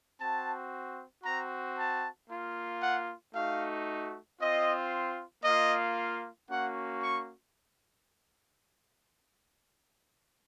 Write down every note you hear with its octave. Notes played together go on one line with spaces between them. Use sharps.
C4 F#4 A5
C4 F#4 A#5
A5
A#3 F4
F#5
A3 D#4 F#4 F5
C4 F4 D#5
A#3 F4 D#5
A#3 C#4 F#4 F#5
C#6